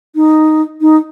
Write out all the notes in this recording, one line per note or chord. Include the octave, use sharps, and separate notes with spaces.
D#4
D#4